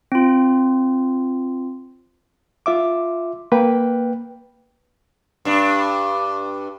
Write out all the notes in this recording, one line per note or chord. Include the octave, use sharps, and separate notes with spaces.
C4 F4
F4 E5 D6
A#3 B4 G5
G2 D4